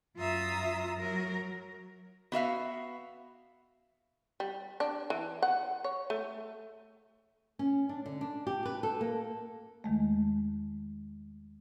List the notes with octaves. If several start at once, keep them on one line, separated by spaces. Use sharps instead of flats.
F#2 F4 E5 A#5 D#6
F#3 A#4
B3 F#4 E5 F5
G3
D4
E3
F#5
C#5
A3
C#4
D4
D3
D4
G4
B4
A4
A#3
E2 D#3 G#3 A3